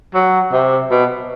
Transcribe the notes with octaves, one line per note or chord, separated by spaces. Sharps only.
F#3
C3
B2